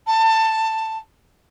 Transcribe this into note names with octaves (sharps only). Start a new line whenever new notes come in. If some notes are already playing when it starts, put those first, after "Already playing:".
A5